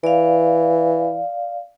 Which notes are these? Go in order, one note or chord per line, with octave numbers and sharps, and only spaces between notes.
E3 D5 F5